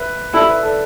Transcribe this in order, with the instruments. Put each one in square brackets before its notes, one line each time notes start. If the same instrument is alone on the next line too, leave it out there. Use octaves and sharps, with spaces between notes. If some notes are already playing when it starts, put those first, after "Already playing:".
Already playing: [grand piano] B4 E5
[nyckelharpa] E4 [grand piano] A4 D5
[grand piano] B4 E5
A4 D5